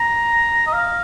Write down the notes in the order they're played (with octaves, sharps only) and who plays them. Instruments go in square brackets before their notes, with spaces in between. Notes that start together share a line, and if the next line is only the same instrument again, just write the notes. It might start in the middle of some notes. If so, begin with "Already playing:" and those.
Already playing: [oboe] A#5
D#5
F5